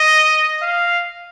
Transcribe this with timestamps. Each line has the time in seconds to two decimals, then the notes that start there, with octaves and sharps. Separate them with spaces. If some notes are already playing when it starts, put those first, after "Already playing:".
Already playing: D#5
0.62 F5